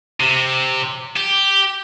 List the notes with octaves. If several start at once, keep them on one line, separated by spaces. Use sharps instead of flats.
C3
G4